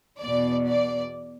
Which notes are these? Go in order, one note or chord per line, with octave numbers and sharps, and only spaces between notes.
E2 B2 D5
D5